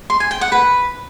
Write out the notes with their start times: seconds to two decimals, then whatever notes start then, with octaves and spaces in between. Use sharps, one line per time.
0.10 C6
0.20 G#5
0.31 G5
0.41 F#5
0.52 B4